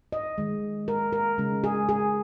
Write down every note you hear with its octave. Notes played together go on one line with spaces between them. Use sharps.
D#5
D#3 G#3
A#4
A#4
C#3 G#3
G#4
G#4